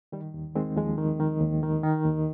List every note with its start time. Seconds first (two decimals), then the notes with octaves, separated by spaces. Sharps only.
0.12 D#3 G3
0.34 D#2
0.55 D#3 G#3 C4
0.76 D#2 F3 G#3
0.98 D#3
1.20 D#3
1.41 D#2
1.63 D#3
1.84 D#3
2.05 D#2